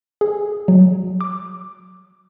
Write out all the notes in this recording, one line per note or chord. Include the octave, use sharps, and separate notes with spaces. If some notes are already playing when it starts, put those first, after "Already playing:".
G#4
F#3
D6